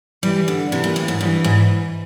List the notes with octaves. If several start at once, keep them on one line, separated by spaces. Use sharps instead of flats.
E3 G3
D3
C3 E3
A#2
A2
G#2
G2 E3
G#2